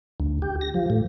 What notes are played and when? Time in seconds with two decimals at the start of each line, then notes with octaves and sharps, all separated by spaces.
0.20 D2
0.42 G4
0.61 A#6
0.74 F3
0.90 A2